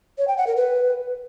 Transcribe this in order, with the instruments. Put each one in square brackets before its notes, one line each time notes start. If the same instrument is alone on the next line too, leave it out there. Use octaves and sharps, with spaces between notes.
[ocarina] C#5
G5
F#5
A#4
B4